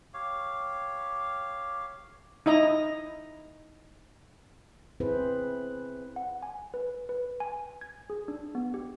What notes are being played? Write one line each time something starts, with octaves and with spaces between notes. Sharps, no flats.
G4 C#5 F5
D#4 E4 D#5 A#5
C4 E4 G#4 B4 C5
F#5
G#5
B4
B4
G#5
G#6
G#4
D4
B3
G4